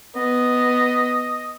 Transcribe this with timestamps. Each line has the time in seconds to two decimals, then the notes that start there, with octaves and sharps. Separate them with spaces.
0.16 B3 D#5